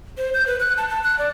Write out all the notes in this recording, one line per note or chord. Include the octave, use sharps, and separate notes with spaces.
C5
G6
B4
F#6
A5
A5
F#6
D5